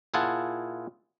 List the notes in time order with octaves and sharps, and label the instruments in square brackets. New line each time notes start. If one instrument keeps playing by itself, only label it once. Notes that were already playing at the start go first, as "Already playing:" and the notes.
[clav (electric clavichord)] A#2 E4 F4 G#4 F#5 A5